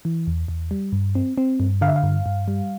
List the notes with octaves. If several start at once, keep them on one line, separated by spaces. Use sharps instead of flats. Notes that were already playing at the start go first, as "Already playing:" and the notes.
E3
E2
E2
G3
G2
C4
C4
G2
D3 F5
E5
F5
G2
G2
G3